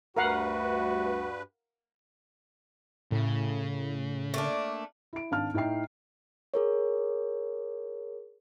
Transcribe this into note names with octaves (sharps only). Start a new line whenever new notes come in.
D2 G2 F#4 A#4 B4 F5 F#5
A2 C#3
A3 A#3 D4
E4 D7
G#1 D4 F5 A5 F6
A2 D#4 E5 G5 C7
G#4 A#4 C#5